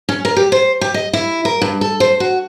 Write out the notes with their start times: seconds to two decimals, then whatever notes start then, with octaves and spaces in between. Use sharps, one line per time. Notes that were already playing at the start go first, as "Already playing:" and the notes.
0.09 C#4
0.25 A#4
0.37 G4
0.52 C5
0.81 G4
0.94 D#5
1.13 E4
1.45 A#4
1.62 G2
1.81 A4
2.00 C5
2.20 F#4